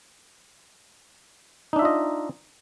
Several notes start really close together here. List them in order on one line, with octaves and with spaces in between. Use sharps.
D#4 D4 E5 F4 D#5